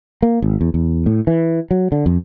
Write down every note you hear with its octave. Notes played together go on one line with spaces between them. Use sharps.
A#3
G#1
E2
E2
A2
E3
F#3
D3
F2